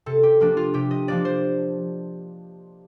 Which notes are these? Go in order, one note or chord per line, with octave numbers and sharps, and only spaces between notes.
C3 A4
G4
F3 A#3 D4
F4
C3 G4
D#5
F3 A#3 D4 D5
C5